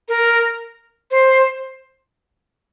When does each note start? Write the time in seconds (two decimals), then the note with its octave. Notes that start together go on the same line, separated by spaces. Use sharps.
0.08 A#4
1.11 C5